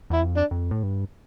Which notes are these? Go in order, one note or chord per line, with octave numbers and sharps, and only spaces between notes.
E2 E4
F2
D4
F2
A2
G2